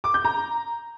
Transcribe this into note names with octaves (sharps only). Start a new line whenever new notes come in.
D6
G6
A#5